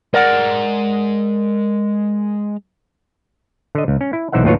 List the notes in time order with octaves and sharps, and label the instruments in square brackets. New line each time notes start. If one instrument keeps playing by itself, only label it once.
[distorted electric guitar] G#3 A#5 [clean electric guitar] A#4 D5 F#5
[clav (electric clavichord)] D3 D#5
C#2
C#4
E4
B1 E3 D#4 C5 E5 F#5
D#2 A2 F#3 F4 B4 C#5